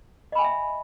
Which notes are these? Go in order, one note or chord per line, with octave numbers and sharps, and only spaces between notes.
D#5 E5 G5 G#5 B5